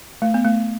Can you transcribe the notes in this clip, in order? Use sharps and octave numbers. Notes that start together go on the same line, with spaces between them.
A3
B3
A3